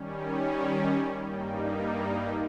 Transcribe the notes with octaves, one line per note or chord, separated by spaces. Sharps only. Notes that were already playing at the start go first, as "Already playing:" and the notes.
Already playing: D#3 G3 C#4
G#5
G2 G3 A#3 D#4 G5
E5